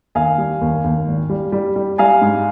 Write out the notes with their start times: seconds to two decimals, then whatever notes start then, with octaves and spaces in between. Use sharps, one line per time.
0.15 D#2 F5 G#5
0.38 G3
0.61 D#2
0.84 D#2
1.08 G#1
1.30 G3
1.52 G3
1.76 G3
1.98 G3 F5 G#5
2.22 G#2